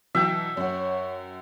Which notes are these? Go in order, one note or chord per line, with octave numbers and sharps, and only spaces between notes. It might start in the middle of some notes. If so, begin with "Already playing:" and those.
B2 E3 F#3 E5 G5
F#2 C#5 F#5